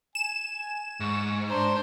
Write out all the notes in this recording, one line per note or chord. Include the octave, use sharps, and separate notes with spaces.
G#5 E7
G#2 C#6
D4 C5 A#5